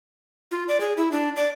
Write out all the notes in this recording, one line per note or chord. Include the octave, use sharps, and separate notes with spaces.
F4
D5
G#4
E4
D4
D5